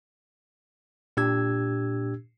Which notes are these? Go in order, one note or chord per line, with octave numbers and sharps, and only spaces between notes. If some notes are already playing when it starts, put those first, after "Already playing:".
A#2 D4 G4 E6 G#6